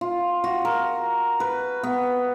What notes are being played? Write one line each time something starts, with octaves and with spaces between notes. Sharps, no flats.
F4
F#4
A#4
B4
B3